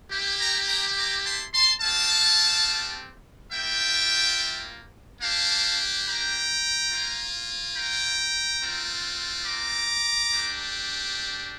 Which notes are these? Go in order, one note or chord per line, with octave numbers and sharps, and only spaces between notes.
A#3 E4 G4
G5 A#5
G5 A#5
A#5 D6
A5 C6
A5 C6
A3 C4 G4 F5 A5
G3 A#3 F4 E5 G5
A#3 D4 G4 F5 A5
G5 A#5
A#3 F4
G5 A#5
A3 C4 F4
A#5 D6
A3 D4 G4